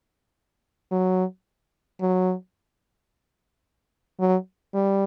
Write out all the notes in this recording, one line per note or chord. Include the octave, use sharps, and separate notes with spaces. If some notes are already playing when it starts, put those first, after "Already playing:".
F#3
F#3
F#3
G3